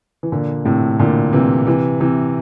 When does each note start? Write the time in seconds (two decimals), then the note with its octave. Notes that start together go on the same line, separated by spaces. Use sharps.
0.23 E3
0.32 A#2 D3
0.65 A2 C3
0.99 A#2 D3
1.33 C3 E3
1.67 C3 E3
2.00 C3 E3